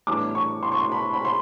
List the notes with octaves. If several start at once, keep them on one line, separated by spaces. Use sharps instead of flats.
A2 E3 G3 B3 D4 D6
C#6
C6
C#6
C6
B5
B5
C6